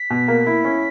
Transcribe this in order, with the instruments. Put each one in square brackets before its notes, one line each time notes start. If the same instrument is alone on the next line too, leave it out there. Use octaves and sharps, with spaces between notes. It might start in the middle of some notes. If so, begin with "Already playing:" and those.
Already playing: [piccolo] B6
[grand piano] B2
A#3
E4
C#4